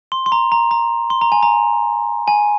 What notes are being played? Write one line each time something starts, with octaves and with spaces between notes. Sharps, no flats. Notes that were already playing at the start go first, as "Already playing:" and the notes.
C6
C6
A#5
A#5
A#5
C6
A#5
G#5
A#5
G#5